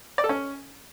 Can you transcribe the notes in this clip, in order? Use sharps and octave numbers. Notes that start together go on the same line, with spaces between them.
D5
A4
C#4